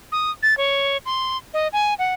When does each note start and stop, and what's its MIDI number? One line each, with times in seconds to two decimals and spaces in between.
0.12 0.31 87
0.43 0.57 93
0.57 0.97 73
1.06 1.37 84
1.54 1.68 75
1.73 1.94 80
1.99 2.14 78